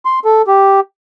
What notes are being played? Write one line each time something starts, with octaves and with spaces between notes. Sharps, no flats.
C6
A4
G4